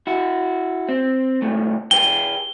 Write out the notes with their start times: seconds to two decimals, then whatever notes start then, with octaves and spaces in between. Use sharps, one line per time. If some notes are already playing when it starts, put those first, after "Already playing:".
0.07 E4 F#4
0.89 C4
1.42 C2 G#2 A3
1.91 G#4 B4 G5 G7